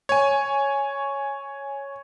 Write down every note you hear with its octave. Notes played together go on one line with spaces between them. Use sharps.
C#5 G#5